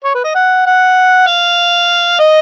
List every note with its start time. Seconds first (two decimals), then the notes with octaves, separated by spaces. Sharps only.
0.04 C#5
0.15 B4
0.24 D#5
0.35 F#5
0.66 F#5
1.27 F5
2.20 D#5